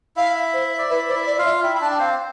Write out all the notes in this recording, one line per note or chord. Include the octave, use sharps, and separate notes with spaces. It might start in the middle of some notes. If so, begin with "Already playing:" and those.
E4 E5 F5
C5
D5
E4 B4 E5
C5 D5
E4 E5
D5
F4 D5 F5
E5
E4 E5 G5
E5 B5
D4 D5 A5
G5
C4 C5 F5